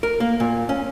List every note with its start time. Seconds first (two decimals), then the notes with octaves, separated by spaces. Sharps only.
0.03 A#4
0.20 A#3
0.40 A#2
0.69 C#4